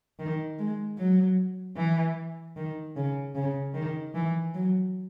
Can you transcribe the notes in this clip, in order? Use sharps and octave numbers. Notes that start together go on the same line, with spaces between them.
D#3
G#3
F#3
E3
D#3
C#3
C#3
D#3
E3
F#3